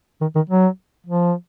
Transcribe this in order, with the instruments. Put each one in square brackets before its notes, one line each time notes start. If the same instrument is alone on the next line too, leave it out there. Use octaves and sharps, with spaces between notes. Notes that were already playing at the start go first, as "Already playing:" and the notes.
[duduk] D#3
D#3
F#3
F3